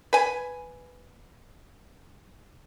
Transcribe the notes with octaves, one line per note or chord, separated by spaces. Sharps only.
B4 G#5